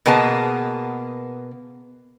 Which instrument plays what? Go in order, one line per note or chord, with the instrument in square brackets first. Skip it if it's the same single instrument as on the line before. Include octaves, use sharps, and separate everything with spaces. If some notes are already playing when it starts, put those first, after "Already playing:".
[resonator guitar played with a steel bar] B2 A#3 B3 G#4 A5